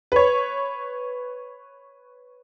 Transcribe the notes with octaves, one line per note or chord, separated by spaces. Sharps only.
B4 C#5